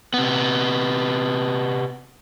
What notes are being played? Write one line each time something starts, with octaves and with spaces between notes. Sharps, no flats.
C3 B3